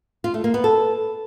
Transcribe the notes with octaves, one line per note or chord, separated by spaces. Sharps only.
F4
A3
A#3
B3
A4